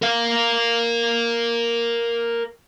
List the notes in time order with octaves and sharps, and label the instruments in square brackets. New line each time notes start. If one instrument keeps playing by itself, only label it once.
[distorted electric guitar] A#4 F5